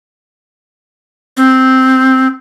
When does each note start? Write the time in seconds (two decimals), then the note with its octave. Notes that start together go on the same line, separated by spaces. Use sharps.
1.37 C4